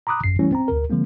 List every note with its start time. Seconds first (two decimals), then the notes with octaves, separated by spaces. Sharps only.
0.07 A#5 B5 D6 D#6 F#6
0.24 A1 F#2 C7
0.39 E3 G3 A3 C#4 E4
0.52 C4 A#5
0.68 D2 A#4
0.90 D3 F3 G#3 A#3 C4